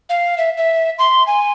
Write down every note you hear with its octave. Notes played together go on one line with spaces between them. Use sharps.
F5
E5
E5
C6
G#5